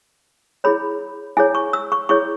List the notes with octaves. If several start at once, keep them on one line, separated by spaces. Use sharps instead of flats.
E4 G#4 C#5 B5
E4 G#4 C#5 G#5
C#6
E6
C#6
E4 G#4 C#5 C#6